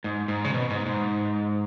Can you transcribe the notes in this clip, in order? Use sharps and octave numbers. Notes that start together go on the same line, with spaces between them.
G#2
G#2
C#3
B2
G#2
G#2